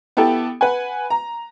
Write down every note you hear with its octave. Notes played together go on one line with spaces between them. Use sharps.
B3 E4 G4 A4
B4 F#5 G#5
A#5